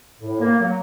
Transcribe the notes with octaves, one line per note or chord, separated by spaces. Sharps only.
A2
A#3
F#3